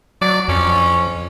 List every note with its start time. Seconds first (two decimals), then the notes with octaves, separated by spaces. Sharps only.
0.21 F#3 D5
0.48 F2 C#4